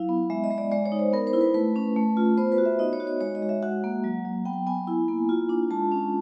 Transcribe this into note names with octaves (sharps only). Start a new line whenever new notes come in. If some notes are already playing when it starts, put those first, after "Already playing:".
Already playing: F#3 E4 F5
B3
G#3 E5
D#5
G#3
D5
G#3 D5
C#5
D#4
C5
B3 A#4
C5
E4
B4
A3 B4
C#4
A3
F4
B3 C5
B4
F#4
E5
D#4 D#5
C#5
F#4
C#5
G#3 C#5
D#5
G#3
E5
F#4 F#5
A#3
F#3
F#3
B3 G5
B3 G#5
E4
A#3
F4
D4
G#3 A5
C#4